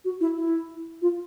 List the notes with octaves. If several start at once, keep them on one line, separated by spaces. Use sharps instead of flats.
F#4
E4
E4
F4